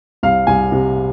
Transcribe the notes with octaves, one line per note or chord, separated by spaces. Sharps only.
C2 F5
C2 G#5
C3